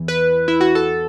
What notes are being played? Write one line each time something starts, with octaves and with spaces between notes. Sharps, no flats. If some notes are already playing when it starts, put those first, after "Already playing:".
Already playing: E2 E3
B4
E4
F#4
A4